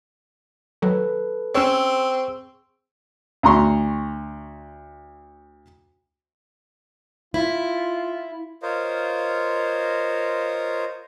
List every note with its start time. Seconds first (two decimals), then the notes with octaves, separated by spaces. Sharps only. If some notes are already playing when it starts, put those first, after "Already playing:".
0.82 D#3 F#3 A4 B4
1.54 C4 C#4 G#4 C#5 C#6 E6
3.43 D2 A#5 C6 C#6
7.34 E4 F4
8.62 F4 A#4 C5 C#5 D#5 F5